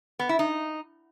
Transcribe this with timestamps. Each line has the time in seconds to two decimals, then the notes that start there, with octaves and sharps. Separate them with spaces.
0.19 B3
0.29 E4
0.39 D#4